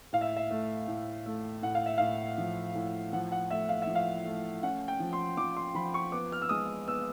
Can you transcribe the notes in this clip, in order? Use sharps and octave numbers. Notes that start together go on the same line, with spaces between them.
A2 F5
E5
E5
A3
A2
A3
A2 F#5
F5
E5
A2 F5
F3
A2
F3 F#5
F#5
A3 E5
F5
E5
F3
F5
A3
C#4 F#5
G5
F3
C6
F3 D6
C6
F3 B5
C#6
B3 D6
F6
E6
G#3 D#6
B3 E6